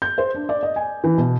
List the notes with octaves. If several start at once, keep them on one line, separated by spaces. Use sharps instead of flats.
G6
C5
D4
D5
D#5
G#5
E3
B2